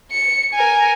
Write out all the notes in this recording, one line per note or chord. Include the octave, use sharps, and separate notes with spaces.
C#7
A#4 G#5